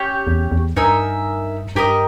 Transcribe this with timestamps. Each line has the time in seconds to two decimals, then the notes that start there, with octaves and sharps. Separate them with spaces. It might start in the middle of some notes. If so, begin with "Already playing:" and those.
Already playing: C#4 G4 C#5
0.27 E2
0.52 E2
0.76 G2 D#4 A#4 E5 G#5
1.76 G2 G4 A#4 D#5